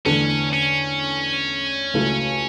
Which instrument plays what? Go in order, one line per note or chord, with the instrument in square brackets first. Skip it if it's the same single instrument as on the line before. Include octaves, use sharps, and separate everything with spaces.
[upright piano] E2 D3 A3 D4 [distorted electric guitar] C#4
[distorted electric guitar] C#4
[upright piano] C#2 C#3 F#3 A3 E4